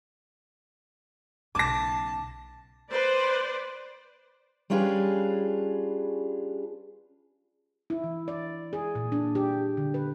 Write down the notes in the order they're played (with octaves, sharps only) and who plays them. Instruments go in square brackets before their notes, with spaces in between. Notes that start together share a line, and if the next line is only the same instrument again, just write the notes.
[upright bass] B1 C#3 [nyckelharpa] A5 [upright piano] D6 A#6
[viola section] B4 C5 D5
[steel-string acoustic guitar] G3 C#4 D4 F4 G#4 B4
[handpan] E4
E3
D5
G#4
A#2
D4
G4
D3
B4